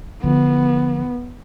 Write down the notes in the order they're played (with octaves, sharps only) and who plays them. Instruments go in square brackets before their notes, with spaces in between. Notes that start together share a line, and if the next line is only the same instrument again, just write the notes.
[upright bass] D3 F3 [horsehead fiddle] B3